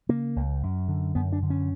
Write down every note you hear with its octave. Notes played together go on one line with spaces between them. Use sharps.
C#3 A#3
C#2
F#2
D3
F#2 B3
D4
D3
C#4